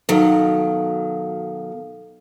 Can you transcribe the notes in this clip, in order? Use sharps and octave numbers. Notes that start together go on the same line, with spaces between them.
B2 D#3 F#3 A4 F5